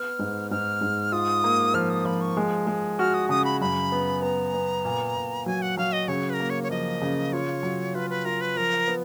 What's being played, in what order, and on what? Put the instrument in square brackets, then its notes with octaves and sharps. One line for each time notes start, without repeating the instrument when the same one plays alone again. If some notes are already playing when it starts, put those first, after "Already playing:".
Already playing: [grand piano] B3 [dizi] F6
[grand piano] G#2
[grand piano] G#2 [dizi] F6
[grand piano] G#2
[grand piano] F4 [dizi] D#6
[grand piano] A#3
[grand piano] F3 [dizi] F6
[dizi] D#6
[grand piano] F3 [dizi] B5
[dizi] C#6
[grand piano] G#3
G#3
[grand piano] F#4 [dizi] F6
[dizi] D#6
[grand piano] C#3 [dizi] D#6
[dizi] B5
[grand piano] F#2 [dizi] B5
[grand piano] B3
[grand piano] B3 [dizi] A#5
[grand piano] B3
A#2
A#2
[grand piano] F#3 [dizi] G#5
[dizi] F#5
[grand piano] F#3 [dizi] F5
[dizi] D#5
[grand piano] C#3 [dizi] C#5
[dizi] B4
A#4
[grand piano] A#3
[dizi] C#5
C#5
[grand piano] F3 [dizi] D#5
[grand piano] C#3
[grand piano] F4 [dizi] C#5
[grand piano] F#3
[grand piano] F4 [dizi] B4
[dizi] B4
[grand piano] F4 [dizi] A#4
[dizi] B4
[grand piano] F3 [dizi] A#4
[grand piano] B3